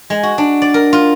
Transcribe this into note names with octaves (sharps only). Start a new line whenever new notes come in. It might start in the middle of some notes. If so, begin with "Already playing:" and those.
G#3
F#4
D4
D5
A#4
F4